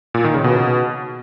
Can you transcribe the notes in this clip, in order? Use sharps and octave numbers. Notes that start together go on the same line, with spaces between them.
A#2
D#3
C#3
B2